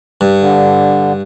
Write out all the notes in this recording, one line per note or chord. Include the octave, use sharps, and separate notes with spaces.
G2
D3